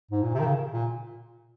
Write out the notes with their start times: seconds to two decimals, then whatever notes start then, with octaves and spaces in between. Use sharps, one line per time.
0.11 G#2
0.23 A#2
0.34 C3
0.40 D#3
0.46 C#3
0.73 A#2